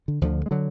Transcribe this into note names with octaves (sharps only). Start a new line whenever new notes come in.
D3
D2 D3 F3
G#3
D3 F#3